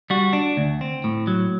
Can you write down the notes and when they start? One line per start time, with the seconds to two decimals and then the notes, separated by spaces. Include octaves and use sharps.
0.10 G3 F#4
0.33 D4
0.57 D2
0.81 C4
1.04 A2
1.27 F#3